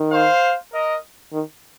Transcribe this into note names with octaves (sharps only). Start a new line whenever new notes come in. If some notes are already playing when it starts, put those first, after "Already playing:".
Already playing: D#3
C5 F5
A#4 D#5
D#3